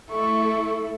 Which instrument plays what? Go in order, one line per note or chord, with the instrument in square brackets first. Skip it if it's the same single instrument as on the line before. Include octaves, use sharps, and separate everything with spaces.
[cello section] A3 E4 A4 [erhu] C#6